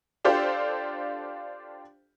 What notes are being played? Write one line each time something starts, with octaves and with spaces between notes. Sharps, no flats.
D4 F4 G4 A4 C5